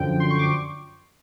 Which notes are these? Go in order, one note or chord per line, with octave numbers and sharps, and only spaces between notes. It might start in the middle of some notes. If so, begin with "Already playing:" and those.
Already playing: F#2 D3 F3 G5
C6
C#6
D6